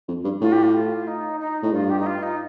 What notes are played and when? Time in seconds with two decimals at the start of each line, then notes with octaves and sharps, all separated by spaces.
0.08 F2
0.24 G2
0.41 A2 F4
0.52 G4
0.63 F4
0.74 F4
1.07 D#4
1.40 D#4
1.62 A2
1.72 G2 F4
1.89 G4
1.99 D#4
2.06 F4
2.22 D#4